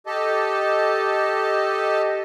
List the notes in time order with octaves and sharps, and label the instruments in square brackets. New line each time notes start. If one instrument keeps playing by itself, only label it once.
[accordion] G4 A4 D#5 A5